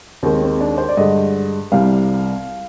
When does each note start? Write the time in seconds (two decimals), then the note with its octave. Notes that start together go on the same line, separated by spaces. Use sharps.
0.23 D#2 D#3 G#3 C4
0.42 C4
0.60 D4
0.78 C5
0.89 D5
0.97 G2 D3 G#3 D#5
1.72 C2 C3 G3 F5